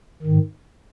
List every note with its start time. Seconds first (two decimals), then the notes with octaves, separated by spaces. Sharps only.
0.23 G#2 D#3